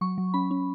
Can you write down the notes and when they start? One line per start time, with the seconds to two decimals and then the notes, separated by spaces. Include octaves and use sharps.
0.01 F#3 C#6
0.18 F#3
0.34 C#4 B5
0.51 C#4